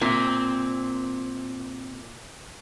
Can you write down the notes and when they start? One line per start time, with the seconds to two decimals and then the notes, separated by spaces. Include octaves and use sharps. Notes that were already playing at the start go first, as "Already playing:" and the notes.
0.01 A#2 C4 E5